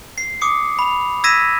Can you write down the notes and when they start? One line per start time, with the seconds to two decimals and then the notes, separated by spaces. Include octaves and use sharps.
0.18 C7
0.41 D6 D#6 C#7
0.79 B5 F7
1.24 E6 G#6 A#6 B6 D#7 E7